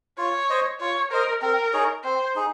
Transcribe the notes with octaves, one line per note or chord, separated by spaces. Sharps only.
F4 C#5
C5 D#5
F4 C#5
A#4 C5 D#5
C4 A#4
D#4 G#4 C#5
C4 C5
D#4 G#4